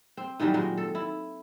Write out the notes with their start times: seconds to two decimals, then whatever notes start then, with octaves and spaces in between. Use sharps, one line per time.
0.17 C4
0.40 D#3 E3 F#3 G3
0.54 A#2 F#3 G#3
0.77 A4
0.95 E4